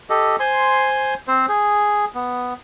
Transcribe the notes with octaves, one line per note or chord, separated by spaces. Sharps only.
G4 A4 D#5
C5 G#5 C6
C4 C5
G#4
B3